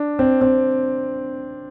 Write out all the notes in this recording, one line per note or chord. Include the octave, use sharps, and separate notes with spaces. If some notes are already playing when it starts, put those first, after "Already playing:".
Already playing: D4
C4
C4